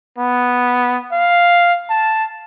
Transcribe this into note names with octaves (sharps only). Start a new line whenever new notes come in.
B3
F5
A5